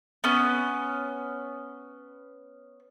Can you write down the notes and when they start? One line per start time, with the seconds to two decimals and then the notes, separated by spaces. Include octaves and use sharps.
0.24 B3 C#4